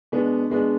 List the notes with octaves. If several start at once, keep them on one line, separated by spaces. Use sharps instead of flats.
B2 G#3 B3 D4
B2 G#3 B3 D4